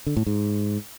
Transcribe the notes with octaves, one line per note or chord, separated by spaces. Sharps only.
D3
A2
G#2